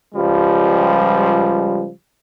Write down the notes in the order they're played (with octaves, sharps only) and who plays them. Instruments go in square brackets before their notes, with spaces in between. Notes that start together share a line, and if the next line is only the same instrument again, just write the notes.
[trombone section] C#2 F3 G3